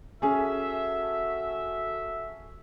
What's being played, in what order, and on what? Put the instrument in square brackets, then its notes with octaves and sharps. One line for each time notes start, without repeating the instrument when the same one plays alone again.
[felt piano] C#4 G#4 [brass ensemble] F#4 A4 E5